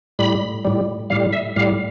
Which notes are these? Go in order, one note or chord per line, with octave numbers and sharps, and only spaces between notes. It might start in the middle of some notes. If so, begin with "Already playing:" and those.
A2 G3 B5
A2 G3
A2 G3 F5
E5
A2 G3 F5